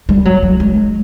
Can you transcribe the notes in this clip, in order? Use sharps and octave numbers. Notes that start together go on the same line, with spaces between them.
G3
F#3
F#3
G#3
G#3